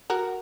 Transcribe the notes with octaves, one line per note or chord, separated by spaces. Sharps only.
F#4 A#4